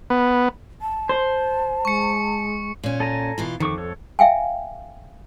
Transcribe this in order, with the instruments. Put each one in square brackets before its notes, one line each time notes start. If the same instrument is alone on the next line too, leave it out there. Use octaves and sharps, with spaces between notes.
[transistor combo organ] B3
[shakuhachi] A5
[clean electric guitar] C5
[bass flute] G#3 [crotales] C#6 C#7
[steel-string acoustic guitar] A#2 C#4
[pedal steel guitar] A4 G#5 A#5
[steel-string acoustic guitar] B2 E3 F4
[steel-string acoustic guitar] F2 [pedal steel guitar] D#3 C#6 D6
[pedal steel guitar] A4 C#5
[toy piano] E5 F5 G5 G#5